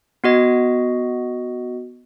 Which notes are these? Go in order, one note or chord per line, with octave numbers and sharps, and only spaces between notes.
B3 F#4 D#5